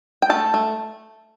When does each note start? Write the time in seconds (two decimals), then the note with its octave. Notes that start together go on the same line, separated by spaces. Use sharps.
0.22 G5
0.30 A3 A5
0.54 A3